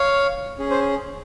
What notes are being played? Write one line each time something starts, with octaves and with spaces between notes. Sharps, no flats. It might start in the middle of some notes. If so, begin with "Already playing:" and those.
Already playing: C#5 F5
C#4 G#4
C5